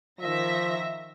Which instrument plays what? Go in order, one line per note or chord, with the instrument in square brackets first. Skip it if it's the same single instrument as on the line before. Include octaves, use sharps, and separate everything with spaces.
[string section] D#3 E5 A#6 [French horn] F3